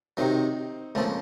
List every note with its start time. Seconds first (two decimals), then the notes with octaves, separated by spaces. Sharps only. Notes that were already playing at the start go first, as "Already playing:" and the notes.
0.17 C3 D#3 F#3 C4 D#4
0.95 C#2 C#3 F3 A3 A#3 C4